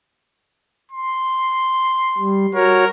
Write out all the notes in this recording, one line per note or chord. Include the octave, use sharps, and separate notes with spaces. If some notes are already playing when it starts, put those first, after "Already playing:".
C6
G3
F#4 A#4 C#5